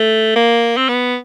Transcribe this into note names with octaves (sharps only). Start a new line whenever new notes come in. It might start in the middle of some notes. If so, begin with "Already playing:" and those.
Already playing: A3
A#3
C4
B3